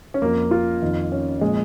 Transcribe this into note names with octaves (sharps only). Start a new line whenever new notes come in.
C#4
F2 F3 A#3
F4
F2 D#3
C#4
A#2 F3 G#3